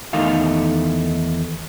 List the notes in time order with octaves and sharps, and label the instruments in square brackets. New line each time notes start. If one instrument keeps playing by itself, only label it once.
[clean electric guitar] E2 D#3 A3 D#4 F5